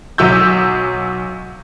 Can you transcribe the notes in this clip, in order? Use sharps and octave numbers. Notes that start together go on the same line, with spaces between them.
B1 F#3 E6 G6